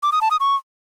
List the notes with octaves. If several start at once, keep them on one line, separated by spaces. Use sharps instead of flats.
D6
D#6
A5
D#6
C#6